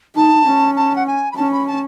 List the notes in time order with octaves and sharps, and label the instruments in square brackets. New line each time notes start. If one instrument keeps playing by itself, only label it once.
[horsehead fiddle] D#4 [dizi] A5
[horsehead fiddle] C#4
[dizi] A5
F#5
G#5
B5
[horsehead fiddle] C#4 [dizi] A5
[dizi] B5
A5